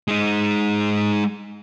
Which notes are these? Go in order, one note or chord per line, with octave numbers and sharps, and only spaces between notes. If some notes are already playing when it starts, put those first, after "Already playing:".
G#3 D#4